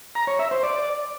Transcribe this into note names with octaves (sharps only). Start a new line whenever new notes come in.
A#5
C#5
E5
C5
D5